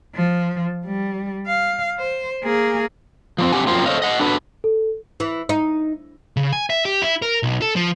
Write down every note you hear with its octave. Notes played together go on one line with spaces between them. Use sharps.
F3
G3
F5
C5
A#3 G#4
F3 A#3 C4
D3 C4 G4 F#5 G#5
F#2 F3 A#3 C4 F4
A4 C5 C#5 D#5 F5
D#5 F#5
D4 F#4 A4 B4
A4
E3
D#4
C#3
G#5
E5
G4
E4
A#4
B1
A4
F3